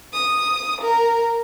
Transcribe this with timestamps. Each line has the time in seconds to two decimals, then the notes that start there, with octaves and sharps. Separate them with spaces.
0.13 D#6
0.81 A#4